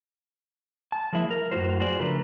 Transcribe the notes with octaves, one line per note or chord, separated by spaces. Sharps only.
A5
F3 G#3 A#3 E4 E5
A#4
F#2 A2 A3 F4 F#4 C5
F4 F#4 G#4 C5 D5
C#3 F3 A3 D4 A#4 B4